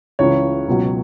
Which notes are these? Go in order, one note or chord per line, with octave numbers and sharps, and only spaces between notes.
C#2 C#3 E3 C#5
C#2 B2 F#3